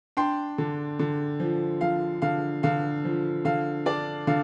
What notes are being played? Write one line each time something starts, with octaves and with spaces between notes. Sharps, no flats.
D4 G5 C6
D3
D3
F3
F3 F5
D3 F5
D3 F5
F3
D3 F5
D4 D5
D3 F5